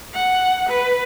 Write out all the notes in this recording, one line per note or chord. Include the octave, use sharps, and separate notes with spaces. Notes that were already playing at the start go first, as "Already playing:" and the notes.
F#5
B4